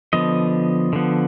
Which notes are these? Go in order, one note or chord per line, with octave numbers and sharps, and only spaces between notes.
D3 F3 B3 D#5
D3 F3 B3